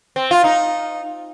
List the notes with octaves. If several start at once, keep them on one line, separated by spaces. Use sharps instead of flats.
C4
F4
D#4